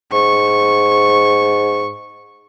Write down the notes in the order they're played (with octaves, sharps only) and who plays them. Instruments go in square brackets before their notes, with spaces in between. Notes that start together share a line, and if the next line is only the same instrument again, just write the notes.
[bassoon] G#2 [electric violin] C#6